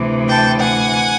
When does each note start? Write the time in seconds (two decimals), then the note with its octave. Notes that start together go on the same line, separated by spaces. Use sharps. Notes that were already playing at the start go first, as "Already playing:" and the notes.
Already playing: D2 C3 E3
0.28 G5 A5
0.60 F#5 G#5